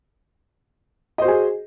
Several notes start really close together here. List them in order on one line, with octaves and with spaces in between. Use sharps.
D#5 C5 F#4 G#4